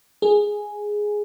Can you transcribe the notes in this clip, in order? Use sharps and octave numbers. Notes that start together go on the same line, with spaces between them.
G#4